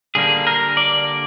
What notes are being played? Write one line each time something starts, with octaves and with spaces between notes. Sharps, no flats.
D3 G3 A#3 D4 G#4
A#4
D5